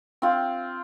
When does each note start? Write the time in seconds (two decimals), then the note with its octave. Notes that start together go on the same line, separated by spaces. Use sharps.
0.22 C4 F4